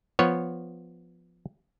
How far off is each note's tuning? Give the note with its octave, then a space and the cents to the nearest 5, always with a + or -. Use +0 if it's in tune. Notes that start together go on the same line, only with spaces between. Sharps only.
F3 +0 B3 +5 C#5 +0